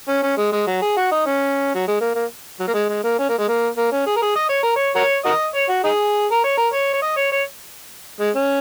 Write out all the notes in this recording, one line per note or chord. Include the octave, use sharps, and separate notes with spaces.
C#4
C#4
G#3
G#3
F#3
G#4
F#4
D#4
C#4
F#3
G#3
A#3
A#3
F#3
A#3
G#3
G#3
A#3
C#4
A#3
G#3
A#3
A#3
C#4
G#4
A#4
G#4
D#5
C#5
A#4
C#5
F#4 A#4 C#5
F#4 A#4 D#5
C#5
F#4
D#4 G#4
A#4
C#5
A#4
C#5
C#5
D#5
C#5
C#5
G#3
C#4